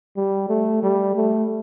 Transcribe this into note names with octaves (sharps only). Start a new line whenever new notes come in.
G3
A3
G3
A3